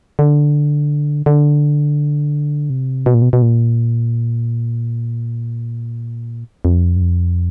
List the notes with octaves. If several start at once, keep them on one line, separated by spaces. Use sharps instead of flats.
D3
D3
C3
B2
A#2
B2
B2
A#2
F2
F#2
F2